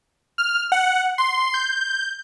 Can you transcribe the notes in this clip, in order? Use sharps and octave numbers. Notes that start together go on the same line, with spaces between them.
F6
F#5
C6
G6